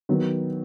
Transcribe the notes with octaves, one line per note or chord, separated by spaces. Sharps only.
D#3 F#3 B3